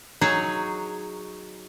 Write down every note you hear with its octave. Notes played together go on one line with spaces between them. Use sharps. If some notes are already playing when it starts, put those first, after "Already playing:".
F#3 D#4 G#4 C#5